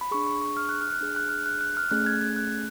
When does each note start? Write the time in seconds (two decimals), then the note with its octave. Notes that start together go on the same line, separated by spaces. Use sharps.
0.01 B5
0.11 D4 G#4 C#6
0.26 C#6
0.42 C#6
0.57 F6
0.69 F#6
0.81 F6
0.92 F#6
1.01 D4 G#4 F6
1.16 F#6
1.29 F6
1.46 F#6
1.61 F#6
1.77 F6
1.91 A3 C#4 G#4 F#6
2.06 G#6
2.21 G#6
2.36 F#6